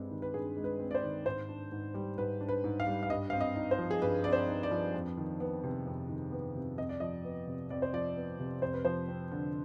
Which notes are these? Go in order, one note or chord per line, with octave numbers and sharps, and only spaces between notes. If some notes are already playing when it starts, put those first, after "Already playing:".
Already playing: G2 G#3 C4
D#3
B4
G2 G#4
G#3
B4
C4
D5
C5
D#3
G#2 C5
D4
G#2
G3
G#2 B4
D4
B4
G#2
F5
G3
F5
G2 D#5
C4 F5
D#5
D#4
C5
F3
G#4
G2 B4
C4 D5
C5
D#4
D5
F3
F2
D#3
B3
C3
F2
D#3
B3
C3
F2 D#5
D5
F3 D#5
B3
C3
F2 D5
C5
F3 D5
B3
C3
F2 C5
B4
F3 C5
C4
D3